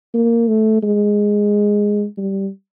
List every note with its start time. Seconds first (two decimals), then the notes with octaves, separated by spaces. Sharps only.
0.14 A#3
0.48 A3
0.83 G#3
2.18 G3